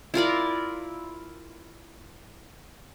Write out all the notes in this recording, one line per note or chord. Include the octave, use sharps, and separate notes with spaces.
E4 F4 A#4 D5